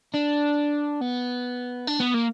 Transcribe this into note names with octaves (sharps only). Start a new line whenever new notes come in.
D4
B3
D4
B3
A#3